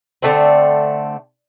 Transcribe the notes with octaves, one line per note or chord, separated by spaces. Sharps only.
D3 A3 C4